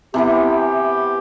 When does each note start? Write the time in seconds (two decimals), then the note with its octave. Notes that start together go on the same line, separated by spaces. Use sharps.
0.14 C3 E3 B3 G4